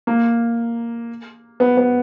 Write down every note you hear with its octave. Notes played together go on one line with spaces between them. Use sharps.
A#3
B3
B3